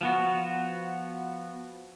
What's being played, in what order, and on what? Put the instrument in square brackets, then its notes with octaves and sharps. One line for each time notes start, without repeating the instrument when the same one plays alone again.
[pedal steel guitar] F3 B3 F#4